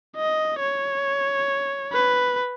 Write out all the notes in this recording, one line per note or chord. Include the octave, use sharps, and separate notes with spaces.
D#5
C#5
B4